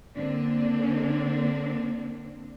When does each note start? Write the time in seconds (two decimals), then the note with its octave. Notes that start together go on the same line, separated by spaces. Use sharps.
0.16 D3 A#3 C4 D4